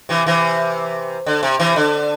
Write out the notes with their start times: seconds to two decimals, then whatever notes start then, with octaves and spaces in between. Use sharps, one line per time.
0.09 C3 E3
0.26 C3 E3
1.26 D3
1.43 C3
1.59 C3 E3
1.76 D3